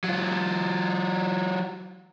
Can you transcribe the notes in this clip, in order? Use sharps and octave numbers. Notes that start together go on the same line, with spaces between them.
F#3 F4